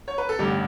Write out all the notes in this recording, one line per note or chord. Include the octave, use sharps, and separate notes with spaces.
C#5
B4
A4
A1 G2 D3 G4